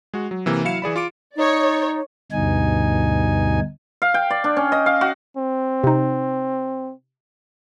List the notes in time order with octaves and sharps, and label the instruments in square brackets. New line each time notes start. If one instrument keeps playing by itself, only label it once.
[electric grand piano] G#3 F#4
F#3
C3 E3 A#3
F#3 E4 F5 C#7 E7
E3 G#4 D5 B5
F4 D6 D7
[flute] D#4 [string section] C#5 D5
[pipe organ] D2 G2 B2 D#4 G#5
[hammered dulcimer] F5
G5
D5
D4
C#4
D#5
F5
F#4
[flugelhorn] C4
[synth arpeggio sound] C3 D#4